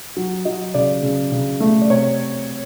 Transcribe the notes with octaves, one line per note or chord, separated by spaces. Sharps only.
F#3
F#3 D#5
C#3 D5
C#3
C#3
A3
D5
C3 C#5